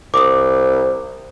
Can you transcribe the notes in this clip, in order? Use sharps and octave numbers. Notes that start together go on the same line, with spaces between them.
C2 D6 D#6